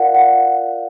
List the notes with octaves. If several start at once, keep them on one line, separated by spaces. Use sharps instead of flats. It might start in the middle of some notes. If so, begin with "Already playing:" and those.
Already playing: F4 A#4 D5 F5 F#5
F#5